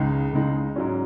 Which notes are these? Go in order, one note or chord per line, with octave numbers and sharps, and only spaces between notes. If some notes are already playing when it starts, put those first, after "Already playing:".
Already playing: C#2 C#3 G#3 D#4
C#2 C#3 G#3 D#4
G#2 F#3 C#4